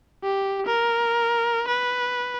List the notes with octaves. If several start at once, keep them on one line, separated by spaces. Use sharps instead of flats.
G4
A#4
B4